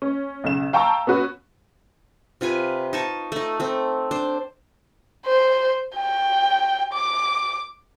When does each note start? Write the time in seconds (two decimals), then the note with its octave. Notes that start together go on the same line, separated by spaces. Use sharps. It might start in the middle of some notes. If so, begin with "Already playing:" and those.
0.02 C#4
0.44 B1 C#3 E7
0.73 F5 G5 A5 A#5 C#6 E6
1.07 B3 C#4 F#4 B4
2.41 C3 F4 B4 G#5
2.93 D#4 A5 C#6
3.32 A3 D#4
3.60 A3 C4
4.11 D4 C5
5.26 C5
5.96 G5
6.94 D6